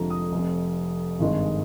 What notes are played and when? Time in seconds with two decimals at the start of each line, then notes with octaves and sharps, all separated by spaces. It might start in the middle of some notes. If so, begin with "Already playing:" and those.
Already playing: F1 F2 D3 F3 G#3 A#5
0.10 D#6
0.32 F1 F2 C3
1.19 G#1 G2 D#3 G#3